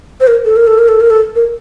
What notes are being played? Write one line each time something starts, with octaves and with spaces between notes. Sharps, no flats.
C5
A#4
A4
A#4
A4
A#4
A4
A#4
A4
A#4